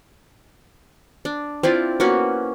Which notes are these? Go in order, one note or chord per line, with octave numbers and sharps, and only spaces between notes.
D4
C4 E4 F4 D5
A#3 B3 C#4 F#4